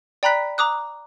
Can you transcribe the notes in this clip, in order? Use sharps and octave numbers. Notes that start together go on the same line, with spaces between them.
D5 G5 A#5 B5 F#6 B6
A#5 D6 D#6 F#6